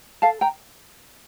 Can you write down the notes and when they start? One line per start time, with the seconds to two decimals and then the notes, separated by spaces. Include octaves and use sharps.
0.22 A4 F5 A5
0.41 G5 A#5